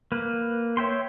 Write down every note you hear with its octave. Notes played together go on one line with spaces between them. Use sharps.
A#3 B4
C#5 E5 G5 C6